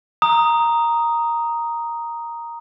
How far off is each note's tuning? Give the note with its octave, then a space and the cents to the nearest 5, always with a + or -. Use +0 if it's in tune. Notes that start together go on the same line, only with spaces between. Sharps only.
A#5 +0 D#6 +0